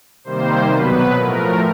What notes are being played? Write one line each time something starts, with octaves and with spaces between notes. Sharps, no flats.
C3 D#3 G3 A#3 C5
B2 F#3 B3 B4
A2 F3 A3 A#4